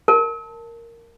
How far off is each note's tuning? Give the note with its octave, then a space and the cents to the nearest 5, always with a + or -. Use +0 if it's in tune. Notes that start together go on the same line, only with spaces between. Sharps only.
A#4 -10 A5 +0